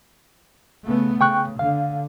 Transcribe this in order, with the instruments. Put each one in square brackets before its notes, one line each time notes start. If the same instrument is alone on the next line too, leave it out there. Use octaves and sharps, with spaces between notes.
[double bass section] C#3 A3 B3
[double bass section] C#3 [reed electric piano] G5 C#6 F#6
[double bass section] D3 [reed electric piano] F5